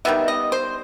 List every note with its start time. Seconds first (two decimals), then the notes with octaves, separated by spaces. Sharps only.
0.05 D#3 G3 B3 E5
0.28 D#5
0.52 C5